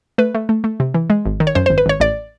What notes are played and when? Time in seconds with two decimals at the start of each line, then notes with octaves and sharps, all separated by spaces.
0.18 A3 B4
0.35 A3
0.49 A3
0.64 A3
0.80 C3
0.94 E3
1.10 G#3
1.26 G#1
1.40 D#3
1.47 C#5
1.55 F#2 C5
1.66 C5
1.70 G#1
1.78 B4
1.86 G#1 C#5
2.00 A1 D5